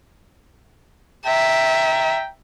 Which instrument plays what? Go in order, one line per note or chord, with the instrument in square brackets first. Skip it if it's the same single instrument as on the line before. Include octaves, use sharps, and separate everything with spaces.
[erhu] E5 [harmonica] G5 A#5